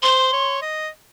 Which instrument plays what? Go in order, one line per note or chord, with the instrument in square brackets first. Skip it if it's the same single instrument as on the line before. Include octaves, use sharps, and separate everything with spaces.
[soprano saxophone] C5 [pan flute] C6
[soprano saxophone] C#5
D#5